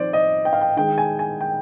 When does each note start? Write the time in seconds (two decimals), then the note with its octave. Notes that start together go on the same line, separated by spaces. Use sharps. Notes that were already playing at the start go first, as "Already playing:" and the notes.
Already playing: F3 C4 D#4 C5 D5
0.13 D#5
0.45 G5
0.53 F5
0.61 G5
0.77 D#3 G#3 D#4 G5
0.98 G#5
1.19 G#5
1.41 G5